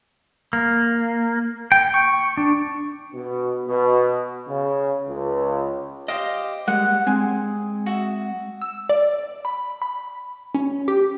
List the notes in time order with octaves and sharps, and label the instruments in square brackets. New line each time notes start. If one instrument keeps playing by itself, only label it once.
[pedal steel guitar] A#3
G5
C#6
D4
[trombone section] B2
B2
C#3
C#2
[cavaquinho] G4 C5 F5 [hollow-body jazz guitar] D#5
[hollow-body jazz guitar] G3 G#3 A#3 [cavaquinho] F#5
[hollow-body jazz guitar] G#3 C4 [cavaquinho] G#5
[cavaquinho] F#4 E5
[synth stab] E6
D5
B5
B5
C#4
G4